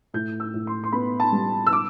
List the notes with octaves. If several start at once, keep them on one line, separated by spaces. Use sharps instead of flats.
A2 G6
E6
A2
C6
C6
B3 B5
A5
G3
E6
D6